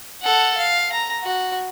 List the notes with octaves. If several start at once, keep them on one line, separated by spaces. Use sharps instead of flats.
A4 F#5
F5
A#5
F#4